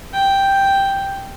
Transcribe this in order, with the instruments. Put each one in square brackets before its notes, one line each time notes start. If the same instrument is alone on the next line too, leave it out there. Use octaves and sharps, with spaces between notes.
[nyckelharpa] G5